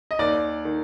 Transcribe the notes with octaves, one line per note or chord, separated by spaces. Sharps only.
D#5
D#2 D#3 D5
D#3